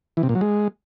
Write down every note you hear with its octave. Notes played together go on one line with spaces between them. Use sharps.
E3
C3
A#2
F#3
G#3